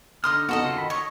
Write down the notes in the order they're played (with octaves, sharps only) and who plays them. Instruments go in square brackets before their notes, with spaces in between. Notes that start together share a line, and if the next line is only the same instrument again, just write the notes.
[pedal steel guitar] D3 F6 [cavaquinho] D#4 C6 D#6
[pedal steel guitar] B3 D#4 [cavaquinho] F#4 A4 D#5
[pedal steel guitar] C#3 F4
D#3 B5
[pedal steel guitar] C#5 D#5 [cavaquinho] C#6